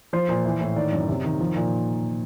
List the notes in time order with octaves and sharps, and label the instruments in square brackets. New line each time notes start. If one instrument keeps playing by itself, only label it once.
[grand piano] F3 C5
A#2
E3
A2
D#3 D5
F#2
C3
D#3
F3
A#2